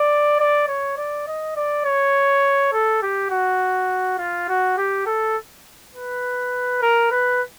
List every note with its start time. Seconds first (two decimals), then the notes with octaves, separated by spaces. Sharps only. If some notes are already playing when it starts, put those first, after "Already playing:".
Already playing: D5
0.40 D5
0.68 C#5
0.98 D5
1.27 D#5
1.56 D5
1.85 C#5
2.72 A4
3.02 G4
3.31 F#4
4.18 F4
4.48 F#4
4.77 G4
5.06 A4
5.94 B4
6.82 A#4
7.11 B4